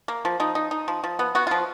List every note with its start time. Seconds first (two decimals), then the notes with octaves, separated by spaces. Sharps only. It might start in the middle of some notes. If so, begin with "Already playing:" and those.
0.08 A#3
0.25 F3
0.40 F3 D#4
0.55 D#4
0.71 D#4
0.88 F3
1.04 F3
1.19 B3
1.35 B3 F#4
1.47 F3 F4